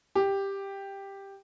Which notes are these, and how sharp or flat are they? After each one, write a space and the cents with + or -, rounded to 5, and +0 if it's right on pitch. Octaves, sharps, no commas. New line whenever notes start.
G4 +5